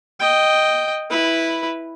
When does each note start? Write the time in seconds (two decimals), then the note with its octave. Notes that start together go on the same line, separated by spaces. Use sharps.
0.20 D#5 G5
1.10 E4 B4